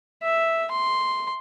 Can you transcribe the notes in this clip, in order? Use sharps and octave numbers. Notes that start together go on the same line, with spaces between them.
E5
C6